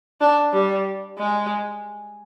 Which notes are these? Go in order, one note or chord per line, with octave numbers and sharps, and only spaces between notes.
D4
G3
G#3